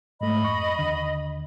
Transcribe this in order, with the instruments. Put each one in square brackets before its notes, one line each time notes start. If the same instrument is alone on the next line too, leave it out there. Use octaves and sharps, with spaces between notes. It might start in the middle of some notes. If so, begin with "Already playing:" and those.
[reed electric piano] G#2 A3 [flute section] D#5 B5
[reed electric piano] F2 C#6
D#2 D3